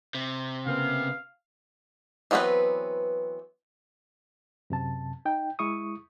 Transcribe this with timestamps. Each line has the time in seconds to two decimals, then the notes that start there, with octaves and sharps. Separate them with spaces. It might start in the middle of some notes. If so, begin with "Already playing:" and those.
0.15 C3
0.66 C#3 A#3 B3 F5
2.31 E3 F#3 B3 C4 B4
4.70 F#2 C3 A5
5.25 D#4 G5
5.59 G#3 E4 C#6 D#6